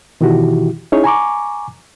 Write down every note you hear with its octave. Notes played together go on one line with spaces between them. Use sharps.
B2 D#3 E3 E4 F#4 G4
C#4 D#4 E4 G#4 C#5
G#5 A#5 C#6 D6